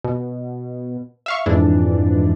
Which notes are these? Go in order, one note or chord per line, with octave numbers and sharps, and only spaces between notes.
B2
E5 F5 C#6
F2 G#2 E3 D4